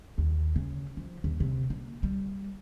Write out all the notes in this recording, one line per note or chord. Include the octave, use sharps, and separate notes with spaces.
D#2
C#3
F3
D#2
C3
A#3
G3